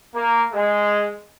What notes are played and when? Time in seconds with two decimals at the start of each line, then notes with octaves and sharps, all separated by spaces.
0.15 A#3
0.53 G#3